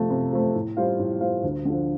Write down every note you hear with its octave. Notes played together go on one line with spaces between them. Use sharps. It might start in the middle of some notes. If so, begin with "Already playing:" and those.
Already playing: C3 F3 A3
C3
F3 A3
A2
G3 F4 C5 F5
A2
G3 F4 C5 F5
D2
D3 F3